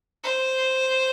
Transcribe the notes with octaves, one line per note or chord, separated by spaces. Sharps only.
C5